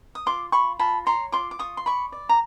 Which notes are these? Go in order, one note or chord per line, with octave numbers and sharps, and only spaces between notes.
D#6
F4 C6 D6
F4 B5 C#6
F4 A5 B5
C#5 A#5 C6
F4 C6 D6
D6
F4 C#6 D#6
C6
D5 B5 C#6
D5
A#5